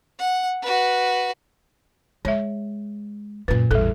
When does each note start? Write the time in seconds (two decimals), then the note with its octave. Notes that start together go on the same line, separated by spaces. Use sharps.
0.19 F#5
0.62 F#4 B4
2.25 G#3 C#5 E5
3.48 F#2 A#2 B4
3.71 A1 E2 G3 A4